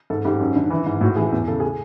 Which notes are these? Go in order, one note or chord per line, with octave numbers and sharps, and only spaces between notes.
G#2 A4
G#2 G4
F#2
D3
E3
G#2
A2 F#4
E3 G#4
E2 G#4
C#3 A4
G#4